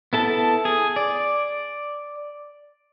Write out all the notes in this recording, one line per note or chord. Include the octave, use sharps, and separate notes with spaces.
B3 E4 A4 A5
G#4
D5